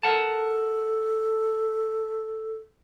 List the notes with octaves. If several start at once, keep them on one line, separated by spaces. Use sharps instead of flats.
A4 A#4 F#5 A5